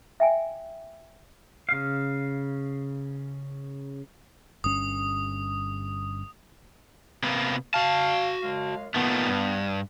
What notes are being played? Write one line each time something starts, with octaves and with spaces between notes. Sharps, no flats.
E5 G5 G#5
C#3 F5
G1 G2 C#4 D#6
C3 A#3 B3
F#4 F5 A5
F#2 G#3 F5
A#2 D#3 A3 B3
G2